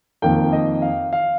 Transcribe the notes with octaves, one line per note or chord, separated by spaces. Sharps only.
F2 D#3 A#3 G5
D#5
F5
F5